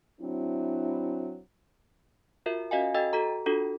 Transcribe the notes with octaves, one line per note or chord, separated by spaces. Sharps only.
F#3 C4 D4 E4
F4 F#4 A#4 E5
C#4 F#4 D#5 F5 G#5
F#4 A4 D#5 G5 E6 A6
F#4 A4 A#5
D4 F4 F#4 A4